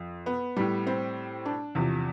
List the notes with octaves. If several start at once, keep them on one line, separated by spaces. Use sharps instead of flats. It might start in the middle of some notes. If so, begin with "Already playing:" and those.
Already playing: F2
B3
A2 G3
C4
D4
E2 C3 F3